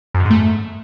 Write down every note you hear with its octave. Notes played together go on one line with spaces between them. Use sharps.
F#2
D#3
G#2
A3